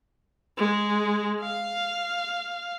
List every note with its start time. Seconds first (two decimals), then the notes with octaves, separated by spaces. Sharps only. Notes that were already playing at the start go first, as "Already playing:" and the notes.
0.57 G#3
1.41 F5